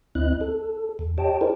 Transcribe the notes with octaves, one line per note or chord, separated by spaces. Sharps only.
D2 C4 E4 D#5 F#6
A4
E2
G4 C#5 D#5 G5 A5
E4 G#4 A#4 C5 D5